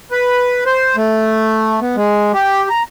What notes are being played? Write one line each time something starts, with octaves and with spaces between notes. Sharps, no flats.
B4
C5
A3
B3
G#3
G4
A#5